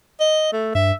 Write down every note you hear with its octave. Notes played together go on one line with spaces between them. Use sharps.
D#5
A3
G2 E5